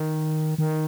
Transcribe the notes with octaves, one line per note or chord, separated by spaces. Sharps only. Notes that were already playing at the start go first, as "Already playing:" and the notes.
Already playing: D#3
D#3